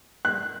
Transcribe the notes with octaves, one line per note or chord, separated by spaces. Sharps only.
F#6